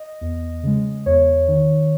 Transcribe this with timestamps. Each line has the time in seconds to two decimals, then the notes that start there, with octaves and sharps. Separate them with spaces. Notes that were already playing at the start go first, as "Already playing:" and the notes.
Already playing: D#5
0.21 E2
0.63 C#3 G#3
1.06 E2 C#5
1.48 D#3